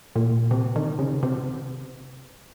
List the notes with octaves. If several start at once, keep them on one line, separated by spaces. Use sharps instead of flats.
A#2
C3
D#3
C#3
C3